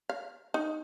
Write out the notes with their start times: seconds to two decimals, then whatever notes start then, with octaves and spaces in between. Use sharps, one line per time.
0.09 F5
0.54 D#4